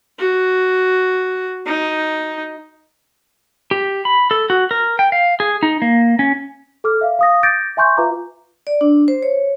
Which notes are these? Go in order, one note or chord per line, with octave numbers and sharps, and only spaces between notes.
F#4
D#4
G4
B5
A4
F#4
A#4
G5
F5
G#4
D#4
A#3
C#4
A4 D6 F6
E5 F5
F5 D#6 A#6
D6 G6 A6 A#6 D7
E5 G#5 C6 C#6 G6
F4 B4 E5 F5 A#5 D6
D5
D4
C5
C#5